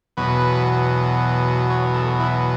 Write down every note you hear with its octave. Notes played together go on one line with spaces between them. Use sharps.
E2 B2 F#3 B4
C#5
A4
E4